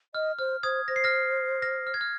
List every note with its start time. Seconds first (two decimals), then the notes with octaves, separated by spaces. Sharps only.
0.15 D#5 F6
0.39 C5 F6
0.63 C5 D#6 G#6
0.88 C5 A#6
0.96 C7
1.04 F6 A#6
1.62 F6 A#6
1.87 F6
1.94 G#6
2.01 F6